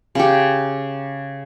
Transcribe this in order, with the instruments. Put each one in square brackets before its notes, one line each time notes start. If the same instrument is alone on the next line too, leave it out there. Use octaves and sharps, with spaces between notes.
[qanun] C#3 G4